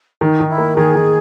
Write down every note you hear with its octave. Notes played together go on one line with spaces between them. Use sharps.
D#3 D#4
D#3
E4
A#3
D#3 G#4
D#3